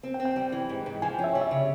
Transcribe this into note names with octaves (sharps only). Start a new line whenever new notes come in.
C4
G5
C4
G5
G3
E3
G#2
G#2
F3 G#5
G5
C#4
E5
G3 C#5
E5
C#3